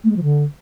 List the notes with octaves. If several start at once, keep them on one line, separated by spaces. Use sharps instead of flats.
A3
G#3
F3
D3